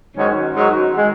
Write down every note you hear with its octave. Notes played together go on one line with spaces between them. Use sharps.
G#2 D#3 F#3 C#4 F#4
G#2 D#3 F#3 C#4 F#4
D#3 G#3